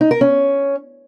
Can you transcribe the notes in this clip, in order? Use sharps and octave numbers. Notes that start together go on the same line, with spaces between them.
D#4
A#4
C#4